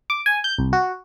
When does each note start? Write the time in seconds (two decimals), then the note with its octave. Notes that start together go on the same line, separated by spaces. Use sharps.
0.10 D6
0.26 G#5
0.44 G6
0.58 C2
0.73 F#4